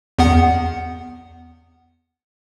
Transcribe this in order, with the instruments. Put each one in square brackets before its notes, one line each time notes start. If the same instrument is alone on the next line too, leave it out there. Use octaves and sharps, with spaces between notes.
[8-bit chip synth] E2 B3 F#5